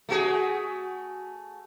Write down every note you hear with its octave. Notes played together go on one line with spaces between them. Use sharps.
A3 F#4 G#4